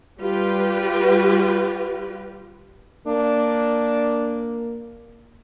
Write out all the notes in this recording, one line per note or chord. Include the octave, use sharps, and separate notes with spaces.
G3 F4 G4 B4
A#3 D4